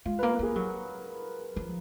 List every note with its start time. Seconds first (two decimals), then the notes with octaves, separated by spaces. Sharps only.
0.05 G#3 F4
0.19 A#3 B4
0.31 A#4
0.39 A#3 G#4
0.55 F#3 G#4
1.56 F3